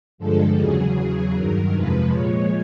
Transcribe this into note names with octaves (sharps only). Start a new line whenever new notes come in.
G2 D3 F3 G#3 A4
E2 C#3 F#3 G#4
E2 C#3 F#3
G2 D#3 F#3 A#4
F2 C3 F3 G#3 B4
A#2 F3 G#3 C#5